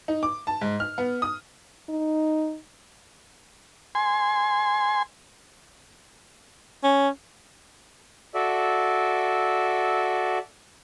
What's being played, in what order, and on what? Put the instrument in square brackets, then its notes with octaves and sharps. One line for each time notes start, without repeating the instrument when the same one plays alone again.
[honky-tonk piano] D#4
D6
A5
G#2
F6
B3
D#6
[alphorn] D#4
[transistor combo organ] G#5 C6
[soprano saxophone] C#4
[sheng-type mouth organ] F#4 A4 D5 E5